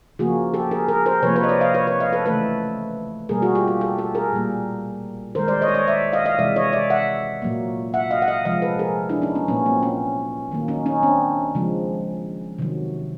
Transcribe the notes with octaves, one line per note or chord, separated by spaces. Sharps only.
C#3 F3 A#3 F#4 G#4
G4 A4
G#4 A#4
G#4 A#4
A#4 C5
C3 F3 A#3 B4 C#5
B4 C#5
D#5
C5 D5
D#5 F5
B4 C#5
B4 C#5
D#5 F5
A4 B4
C#3 E3 A3 A4 B4
B2 G3 A#3 G#4 A#4
F#4 G#4
F4 G4
F4 G4
G4 A4
G4 A4
G#4 A#4
A#2 G3 A#3
D#3 G#3 A#4 C5
C5 D5
C#5 D#5
D5
C#5 D#5
D5 E5
D#5 F5
D#5 F5
C3 E3 G#3 D5 E5
C#5 D#5
D5 E5
E5 F#5
A#2 F#3 A#3
E5 F#5
D#5 F5
F#5
D#5 F5
C3 F3 G#3 D#5 F5
A4 B4
G#4 A#4
D4 E4
C#4 D#4
B3 C#4
A#2 F#3 A#3 B3 C#4
A#3 C4
B3 C#4
D#3 F#3 A#3
C#4 D#4
C#4 D#4
C4 D4
C#3 F3 G#3
C3 D#3 F#3